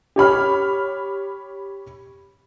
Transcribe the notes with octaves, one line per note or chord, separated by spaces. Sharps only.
G4 C#5 B5 F6